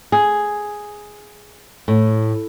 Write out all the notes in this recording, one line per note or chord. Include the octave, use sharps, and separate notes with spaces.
G#4
A2